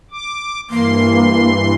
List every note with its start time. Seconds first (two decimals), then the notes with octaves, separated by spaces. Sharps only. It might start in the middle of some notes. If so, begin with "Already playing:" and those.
0.11 D6
0.70 G2 E3 A#3 C6